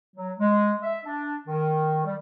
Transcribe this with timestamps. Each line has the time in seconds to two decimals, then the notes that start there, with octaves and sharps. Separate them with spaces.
0.16 F#3
0.38 G#3
0.82 E5
1.05 D4
1.48 D#3
2.05 G3